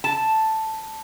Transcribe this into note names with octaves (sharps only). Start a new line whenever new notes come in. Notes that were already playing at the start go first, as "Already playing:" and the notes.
A5